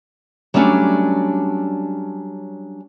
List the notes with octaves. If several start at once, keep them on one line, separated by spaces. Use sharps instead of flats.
F#3 G3 A3 C#4 D4